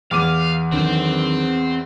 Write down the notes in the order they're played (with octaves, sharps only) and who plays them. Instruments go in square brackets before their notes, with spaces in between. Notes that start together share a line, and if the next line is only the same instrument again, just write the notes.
[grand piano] E2 D6 D#7 [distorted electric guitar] F5
[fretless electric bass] D3 D#3 F#3 [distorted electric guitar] C4 G5